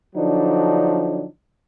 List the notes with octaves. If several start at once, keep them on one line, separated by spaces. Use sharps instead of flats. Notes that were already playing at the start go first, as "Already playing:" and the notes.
D3 F3 F#3 D4 D#4